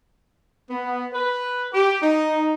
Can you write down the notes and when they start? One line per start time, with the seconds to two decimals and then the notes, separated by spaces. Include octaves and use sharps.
0.70 B3
1.13 B4
1.73 G4
2.02 D#4